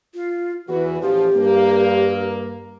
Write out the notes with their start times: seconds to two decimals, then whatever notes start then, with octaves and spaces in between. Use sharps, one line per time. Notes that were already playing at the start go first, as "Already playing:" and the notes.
0.15 F4
0.69 E2 E3 F#4 B4
1.02 A1 F3 G4
1.35 G2 A#3